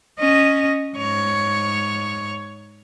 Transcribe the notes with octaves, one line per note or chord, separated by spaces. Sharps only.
C#4 D#5
G#2 C#5